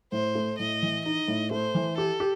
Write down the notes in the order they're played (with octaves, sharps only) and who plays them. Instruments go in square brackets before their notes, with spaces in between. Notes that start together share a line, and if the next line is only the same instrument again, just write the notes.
[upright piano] A2 [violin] C5
[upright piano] A3
[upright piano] A2 [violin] D#5
[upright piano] E3
[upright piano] D#4 [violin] D#5
[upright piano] A2
[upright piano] A3 [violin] C5
[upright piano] E3
[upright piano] G4 [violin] A4
[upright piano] G4